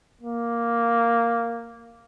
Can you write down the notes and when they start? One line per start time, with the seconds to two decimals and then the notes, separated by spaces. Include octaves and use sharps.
0.21 A#3